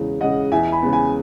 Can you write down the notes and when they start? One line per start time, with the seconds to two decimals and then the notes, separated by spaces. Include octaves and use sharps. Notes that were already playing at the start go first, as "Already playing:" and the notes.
Already playing: E2 C#3 G#3
0.20 C#3 G#3 D#5 F#5
0.52 E2 E5 G#5
0.72 G#5 B5
0.82 C#3 G#3 B3
0.93 G#5 B5